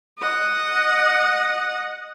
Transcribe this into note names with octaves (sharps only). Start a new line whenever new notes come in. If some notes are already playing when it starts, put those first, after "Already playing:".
D#5 F#5